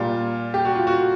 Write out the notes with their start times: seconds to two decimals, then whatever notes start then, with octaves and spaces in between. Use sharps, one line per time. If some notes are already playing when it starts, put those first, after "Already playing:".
Already playing: A#2 G3 F4
0.54 G4
0.65 F#4
0.75 F4
0.87 F#4